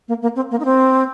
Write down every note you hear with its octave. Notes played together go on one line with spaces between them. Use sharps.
A#3
A#3
C4
A#3
D#4
C4